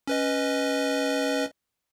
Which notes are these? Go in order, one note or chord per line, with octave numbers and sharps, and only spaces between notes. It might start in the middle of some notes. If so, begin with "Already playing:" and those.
C#4 B4 D#5